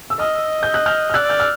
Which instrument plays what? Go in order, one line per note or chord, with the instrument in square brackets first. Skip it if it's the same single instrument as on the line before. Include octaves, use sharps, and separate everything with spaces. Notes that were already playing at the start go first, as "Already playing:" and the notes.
[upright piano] E6
[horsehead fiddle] D#5 [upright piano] D#6 F6
[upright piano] G6
F#6
F6 G6
F6
[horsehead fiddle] D5 [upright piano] E6 F#6
[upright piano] F6 G6
F6